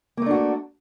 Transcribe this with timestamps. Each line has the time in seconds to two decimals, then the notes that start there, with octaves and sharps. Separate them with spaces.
0.17 A#3
0.22 A3
0.26 D4
0.31 F#4